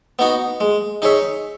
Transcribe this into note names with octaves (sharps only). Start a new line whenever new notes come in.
B3 D#4 F#4
G#3
D#4 G#4 C#5 E5